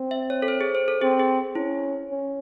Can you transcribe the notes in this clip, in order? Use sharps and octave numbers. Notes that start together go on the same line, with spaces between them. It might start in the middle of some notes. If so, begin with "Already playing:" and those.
Already playing: C4
E5
C#5
A4
C5
G#4
C5
A4
C4 G#4
G#4
C#4 E4
C#4